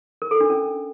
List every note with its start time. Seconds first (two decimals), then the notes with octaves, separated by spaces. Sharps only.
0.22 A#4
0.31 A4
0.40 D4
0.50 C#4